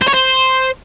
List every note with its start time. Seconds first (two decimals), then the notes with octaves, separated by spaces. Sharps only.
0.02 C5
0.08 C#5
0.14 C5